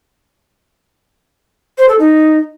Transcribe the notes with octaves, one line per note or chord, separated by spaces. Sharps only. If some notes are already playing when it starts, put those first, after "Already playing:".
C5
A4
D#4